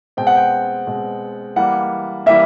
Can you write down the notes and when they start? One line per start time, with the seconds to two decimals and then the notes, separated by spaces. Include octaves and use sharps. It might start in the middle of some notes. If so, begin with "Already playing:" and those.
0.17 B2 G#3 C4 G5
0.27 F#5
0.36 G5
0.87 B2 G#3 C4
1.56 E3 G3 A#3 F#5
2.26 E3 G3 A#3 E5